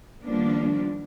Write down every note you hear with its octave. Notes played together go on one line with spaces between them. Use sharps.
D#3 F3 G3 A#3 B3 D4